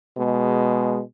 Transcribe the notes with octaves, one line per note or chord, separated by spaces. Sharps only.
B2 G#3